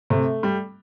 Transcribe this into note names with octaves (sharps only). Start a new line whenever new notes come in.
C3 A3
G3